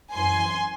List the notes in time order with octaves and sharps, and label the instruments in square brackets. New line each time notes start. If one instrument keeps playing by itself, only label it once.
[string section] F#2 E3 G#5 C6